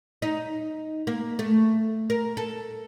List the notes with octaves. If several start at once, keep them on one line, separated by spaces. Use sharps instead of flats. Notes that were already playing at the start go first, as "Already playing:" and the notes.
D#4
A#3
A3
A#4
A4